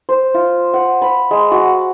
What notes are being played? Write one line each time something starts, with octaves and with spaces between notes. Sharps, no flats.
C5
F4
F#5
B5
G#3
F#4